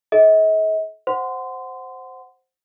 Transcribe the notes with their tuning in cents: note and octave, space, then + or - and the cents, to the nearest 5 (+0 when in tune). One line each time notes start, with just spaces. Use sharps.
A4 -40 D#5 +45
C5 +0 F#5 +0 C6 -25